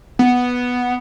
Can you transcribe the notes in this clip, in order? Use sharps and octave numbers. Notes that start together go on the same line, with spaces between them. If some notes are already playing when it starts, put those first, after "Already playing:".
B3